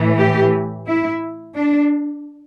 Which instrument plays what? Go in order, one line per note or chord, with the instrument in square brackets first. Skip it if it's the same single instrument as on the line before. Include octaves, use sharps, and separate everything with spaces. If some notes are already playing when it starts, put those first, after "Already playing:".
Already playing: [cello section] A2 E3
G4
E4
D4